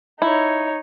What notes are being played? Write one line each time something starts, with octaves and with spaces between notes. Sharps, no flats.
D#4 E4 C#5